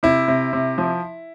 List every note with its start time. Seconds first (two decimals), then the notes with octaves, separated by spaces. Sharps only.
0.03 C3 E4
0.28 C3
0.53 C3
0.78 F3